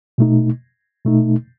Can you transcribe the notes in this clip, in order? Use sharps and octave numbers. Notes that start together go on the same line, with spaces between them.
B2 A3 D#4
B2 A3 D#4